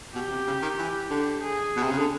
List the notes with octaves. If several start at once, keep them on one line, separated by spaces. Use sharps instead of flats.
B2 G4
C3
C#3
D#3
E3
D3
G#4
B2
C3
C#3
D3